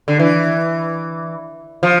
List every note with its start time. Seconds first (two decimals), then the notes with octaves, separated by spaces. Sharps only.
0.08 D3
0.19 E3
1.83 F3